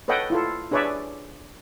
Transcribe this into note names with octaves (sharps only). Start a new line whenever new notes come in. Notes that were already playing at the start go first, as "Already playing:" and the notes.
A4 B4 C#5 D#5 F#5 G5
E4 F4 A4
D4 G#4 B4 C#5 D5 E5